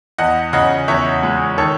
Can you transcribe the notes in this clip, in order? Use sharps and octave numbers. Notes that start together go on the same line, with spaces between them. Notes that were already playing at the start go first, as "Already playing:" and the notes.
E2 D#5 F#5
C#3 D#5 F#5
E2 C#5 E5
G#3
D#3 A4 C#5